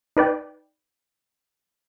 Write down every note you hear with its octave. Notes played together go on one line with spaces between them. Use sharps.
D#4 B4 D5 G5